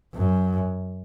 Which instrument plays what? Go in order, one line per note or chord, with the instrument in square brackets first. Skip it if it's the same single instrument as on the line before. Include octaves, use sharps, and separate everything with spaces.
[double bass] F#2